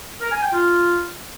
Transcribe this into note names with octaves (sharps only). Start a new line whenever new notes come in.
A#4
G#5
G5
F4